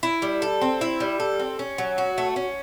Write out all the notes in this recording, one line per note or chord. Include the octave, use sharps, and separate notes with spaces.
E4
G3
A4
C4
E4
G3
A4
C4
C#4
F#3
F#4
A3
C#4